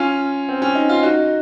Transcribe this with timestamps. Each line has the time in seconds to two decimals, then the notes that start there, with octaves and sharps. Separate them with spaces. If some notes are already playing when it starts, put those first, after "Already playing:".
Already playing: C#4 F4
0.48 C4
0.62 C#4
0.75 D#4
0.89 F4
1.03 D#4 F#4